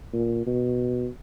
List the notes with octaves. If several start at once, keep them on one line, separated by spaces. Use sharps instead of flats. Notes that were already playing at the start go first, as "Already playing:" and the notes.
A#2
B2